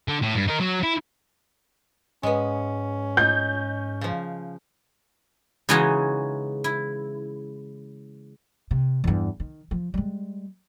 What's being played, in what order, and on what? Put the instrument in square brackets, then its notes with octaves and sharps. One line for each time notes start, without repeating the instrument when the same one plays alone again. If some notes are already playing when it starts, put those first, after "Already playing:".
[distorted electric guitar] D3
A2
G2
D#4 A#4
F#3
E4
[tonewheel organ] G#2 [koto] G#3 B3 [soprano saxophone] C#4
[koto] D#4 [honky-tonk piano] G6
[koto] C#3 F3
[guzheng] C#3 E3 G#3 C#4 D#4 F#4
E4
[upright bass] C3
E2 G2
D#3
F3
G3 G#3